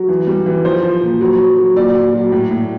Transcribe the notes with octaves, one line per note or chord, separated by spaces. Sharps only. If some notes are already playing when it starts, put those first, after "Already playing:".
Already playing: F#3
E3
G3
E3
F3 C5
F3
A#2
F#3
F#3
F#3
A#2 D5
A#2
F#3
A2
A2